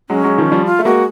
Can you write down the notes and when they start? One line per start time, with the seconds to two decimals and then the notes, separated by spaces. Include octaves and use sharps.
0.10 F#3 G#3 C#4
0.24 F#3 G#3
0.38 D#3 F3
0.52 F3 G3
0.66 F4
0.79 A3
0.85 G#3 A#3 F#4